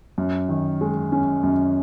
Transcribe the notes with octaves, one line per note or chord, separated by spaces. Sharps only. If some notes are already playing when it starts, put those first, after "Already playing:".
F#2
D#3
G#3
C#4
F#2